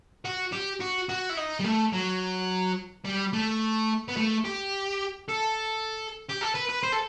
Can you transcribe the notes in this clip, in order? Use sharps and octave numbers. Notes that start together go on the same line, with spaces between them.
F#4
G4
F#4
F#4
E4
D#4
G3
A3
F#3
G3
A3
B3
A3
G4
A4
G4
A4
B4
B4
C5
A4